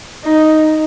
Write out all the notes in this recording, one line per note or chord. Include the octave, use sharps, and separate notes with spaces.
D#4